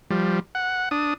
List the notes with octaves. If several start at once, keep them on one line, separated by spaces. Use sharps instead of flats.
F3 G3
F#5
D4 D#6